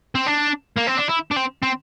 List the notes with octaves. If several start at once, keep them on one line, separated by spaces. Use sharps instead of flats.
C4
D4
A#3
C4
D4
E4
D4
C4
C4